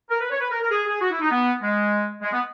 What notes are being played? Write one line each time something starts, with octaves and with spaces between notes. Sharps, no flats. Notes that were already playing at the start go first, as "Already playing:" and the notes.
A#4
B4
C#5
B4
A#4
A#4
G#4
G#4
F#4
E4
D#4
B3
G#3
G#3
B3